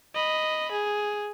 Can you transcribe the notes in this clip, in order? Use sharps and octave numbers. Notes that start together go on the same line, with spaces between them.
D#5 B5
G#4